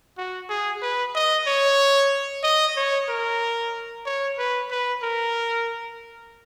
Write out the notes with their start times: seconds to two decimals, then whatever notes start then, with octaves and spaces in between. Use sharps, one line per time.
0.18 F#4
0.50 G#4
0.82 B4
1.15 D#5
1.47 C#5
2.43 D#5
2.77 C#5
3.09 A#4
4.06 C#5
4.38 B4
4.71 B4
5.02 A#4